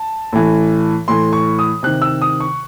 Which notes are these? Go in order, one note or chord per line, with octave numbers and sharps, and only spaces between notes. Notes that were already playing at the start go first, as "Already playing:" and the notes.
Already playing: A5
A2 E3
A2 E3 C6
C#6
D#6
C3 D#3 F#6
E6
D#6
C#6